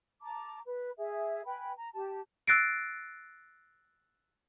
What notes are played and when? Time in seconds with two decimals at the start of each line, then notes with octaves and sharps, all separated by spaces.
0.22 A5 A#5 D6
0.65 B4
0.98 G#4 E5
1.46 B4 G5 G#5 B5
1.75 A#5
1.94 G4 A5
2.48 E6 F#6 A6 A#6 C7 D7